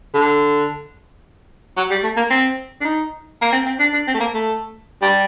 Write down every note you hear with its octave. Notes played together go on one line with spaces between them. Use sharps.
D3
F#3
G3
A3
A#3
C4
D4
D#4
A#3
C4
C4
D4
D4
C4
A3
A#3
A3
G3